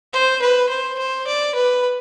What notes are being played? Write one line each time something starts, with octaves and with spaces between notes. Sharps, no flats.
C5
B4
C5
C5
D5
B4